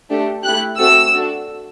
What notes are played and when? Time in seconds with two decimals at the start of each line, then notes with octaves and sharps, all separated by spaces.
0.10 A3 D4 G4
0.43 A3 E4 G4 F#6
0.78 A3 C4 F#4 A4 E6
1.13 D4 F#4 A4